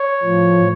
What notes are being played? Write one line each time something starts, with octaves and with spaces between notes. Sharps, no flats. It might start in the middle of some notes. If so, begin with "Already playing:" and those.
Already playing: C#5
A2 F3